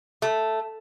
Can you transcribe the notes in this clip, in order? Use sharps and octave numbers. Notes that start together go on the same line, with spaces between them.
A3